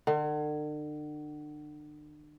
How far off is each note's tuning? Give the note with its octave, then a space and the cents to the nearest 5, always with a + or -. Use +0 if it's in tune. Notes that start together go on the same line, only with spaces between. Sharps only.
D3 +40